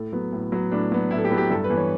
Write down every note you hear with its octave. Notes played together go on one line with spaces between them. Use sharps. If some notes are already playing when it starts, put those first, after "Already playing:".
Already playing: A2 A4
F#3 B3
A2
F#3 B3
A2 D4
F#3 B3
A2 E4
A4
G4
F#3 B3
G4
G2 A4
B4
E3 B3
C#5